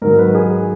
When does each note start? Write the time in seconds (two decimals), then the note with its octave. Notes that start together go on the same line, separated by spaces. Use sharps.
0.02 G#2 D#3 F#3 A#4
0.19 B4
0.35 G#4